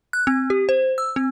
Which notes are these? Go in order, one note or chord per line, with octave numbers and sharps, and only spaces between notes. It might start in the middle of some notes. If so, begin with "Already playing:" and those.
F#6
C4
G4
C5
E6
C4